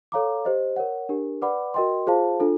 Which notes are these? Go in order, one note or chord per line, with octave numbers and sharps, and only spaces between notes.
A4 C#5 F5 A#5 D6
G4 C5 D#5
A#4 C#5 F#5
D4 G4 A#4
B4 D5 F#5 B5 D6
F#4 A#4 D#5 G5 C6
F4 G#4 C5 F5 A5
D4 F4 A4